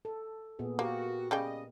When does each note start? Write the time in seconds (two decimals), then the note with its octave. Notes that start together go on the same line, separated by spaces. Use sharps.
0.05 A4
0.59 A#2 B3 G#4
0.79 A#3 F#4 G4 A#4
1.31 C#3 G3 D#5 G5